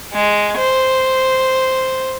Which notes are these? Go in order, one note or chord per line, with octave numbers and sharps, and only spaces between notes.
G#3
C5